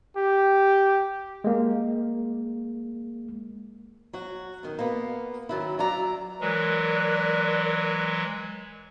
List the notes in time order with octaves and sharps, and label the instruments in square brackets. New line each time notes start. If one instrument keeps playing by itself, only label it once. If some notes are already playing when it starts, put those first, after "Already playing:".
[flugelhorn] G4
[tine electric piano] G#3 A#3
[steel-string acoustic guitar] F#3 F#4
B2 D#3
A#3 B3
D#3 F#3 E4
F#3 F4 D5 E5 A#5
[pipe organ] E3 F#3 G#3 [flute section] A#4 D5 F#6